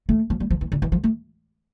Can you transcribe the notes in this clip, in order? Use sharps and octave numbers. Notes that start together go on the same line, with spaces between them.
A3
F3
G3
F3
E3
D3
E3
F3
A3